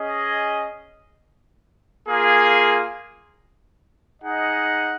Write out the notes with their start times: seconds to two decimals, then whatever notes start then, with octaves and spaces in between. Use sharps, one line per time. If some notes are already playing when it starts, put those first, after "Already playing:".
Already playing: C#4 G#4 D#5
2.07 A#3 F4 G#4
4.22 D#4 G#4 D#5 F#5